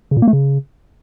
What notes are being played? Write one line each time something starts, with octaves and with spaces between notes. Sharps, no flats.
C#3
A#2
A#3
A3
C#3